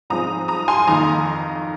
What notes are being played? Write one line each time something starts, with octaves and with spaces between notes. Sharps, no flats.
G#2 F3 G#3 C4 A#5 D#6
A#5 D#6
G#5 C6
F2 D#3 A#3 D#4 A#5 D#6